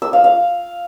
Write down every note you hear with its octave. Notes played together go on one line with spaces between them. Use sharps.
E6
F5
F5